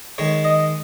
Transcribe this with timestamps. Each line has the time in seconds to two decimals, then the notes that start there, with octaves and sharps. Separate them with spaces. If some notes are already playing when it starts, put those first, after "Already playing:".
0.18 D#3 G#3 C#5
0.45 D#5